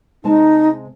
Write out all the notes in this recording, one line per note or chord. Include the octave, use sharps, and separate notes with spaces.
C3 G#3 D#4 A5